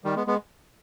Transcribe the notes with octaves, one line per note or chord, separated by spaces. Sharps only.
D#3 G3
G#3 B3
G#3 B3